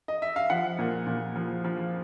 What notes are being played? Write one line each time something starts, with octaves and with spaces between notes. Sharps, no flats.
D#5
E5
F5
F3 F#5
A#2
A#2
F3
F3